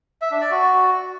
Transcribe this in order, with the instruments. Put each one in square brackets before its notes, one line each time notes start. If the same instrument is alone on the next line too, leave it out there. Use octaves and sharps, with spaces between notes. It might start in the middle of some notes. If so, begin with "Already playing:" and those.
[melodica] E5
D4
D5
F#4